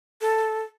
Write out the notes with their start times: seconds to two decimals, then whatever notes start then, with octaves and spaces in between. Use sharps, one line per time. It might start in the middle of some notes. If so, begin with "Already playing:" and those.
0.21 A4